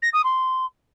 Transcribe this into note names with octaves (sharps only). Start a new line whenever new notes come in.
A#6
D#6
C6